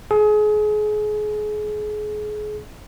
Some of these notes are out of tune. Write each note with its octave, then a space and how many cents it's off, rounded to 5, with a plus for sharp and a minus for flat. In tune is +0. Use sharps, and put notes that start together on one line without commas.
G#4 +30